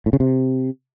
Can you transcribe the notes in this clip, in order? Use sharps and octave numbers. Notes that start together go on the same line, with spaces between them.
A2
C#3
C3